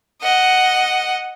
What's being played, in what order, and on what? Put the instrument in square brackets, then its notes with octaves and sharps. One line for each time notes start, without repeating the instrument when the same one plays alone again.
[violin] D#5 F#5